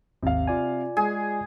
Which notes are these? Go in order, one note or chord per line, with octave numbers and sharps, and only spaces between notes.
G#1 D#2 C3 F5
F4 D5 G#5
G#3 G#4